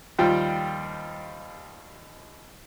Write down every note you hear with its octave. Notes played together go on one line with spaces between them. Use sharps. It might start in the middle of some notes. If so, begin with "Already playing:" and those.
D#2 F3 G3 F4 G5